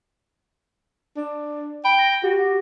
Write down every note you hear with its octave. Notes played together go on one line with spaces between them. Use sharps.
D4
G5 B5
A#6
F#4 G4